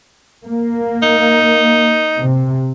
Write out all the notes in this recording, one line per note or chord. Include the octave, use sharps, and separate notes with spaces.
A#3
D#4
C3